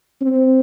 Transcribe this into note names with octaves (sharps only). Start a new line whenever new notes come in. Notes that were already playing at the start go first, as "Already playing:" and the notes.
C4